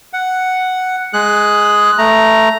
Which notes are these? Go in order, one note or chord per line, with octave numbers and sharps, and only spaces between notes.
F#5
G#3 G#4 F#6
A3 A#5